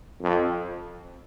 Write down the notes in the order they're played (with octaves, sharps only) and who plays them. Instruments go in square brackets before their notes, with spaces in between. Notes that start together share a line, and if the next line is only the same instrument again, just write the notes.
[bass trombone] F2